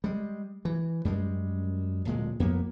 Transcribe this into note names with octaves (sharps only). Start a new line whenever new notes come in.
G3 G#3
E3
F#2 G3 G#3
D1 A#2 G#3
F2 A#3 B3